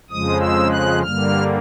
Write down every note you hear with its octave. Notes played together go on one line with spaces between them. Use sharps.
F2 C#3 F3 G#3 D#6
E6
F#6
G2 D3 G3 A#3 F6